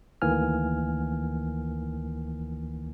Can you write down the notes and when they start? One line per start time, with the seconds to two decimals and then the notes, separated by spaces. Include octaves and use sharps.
0.22 D2 D#3 E3 A#3 G#5 F6